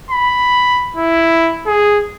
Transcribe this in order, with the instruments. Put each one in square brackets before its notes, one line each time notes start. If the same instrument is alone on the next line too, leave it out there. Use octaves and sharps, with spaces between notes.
[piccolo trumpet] B5
E4
G#4